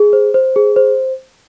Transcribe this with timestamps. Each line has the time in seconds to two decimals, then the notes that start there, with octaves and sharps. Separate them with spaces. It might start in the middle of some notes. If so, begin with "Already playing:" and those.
Already playing: G#4
0.13 C5
0.34 C5
0.56 G#4
0.76 C5